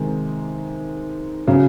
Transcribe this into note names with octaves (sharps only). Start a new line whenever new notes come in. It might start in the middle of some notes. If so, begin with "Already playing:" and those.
Already playing: C3 D#3 G#3
C#3 F#3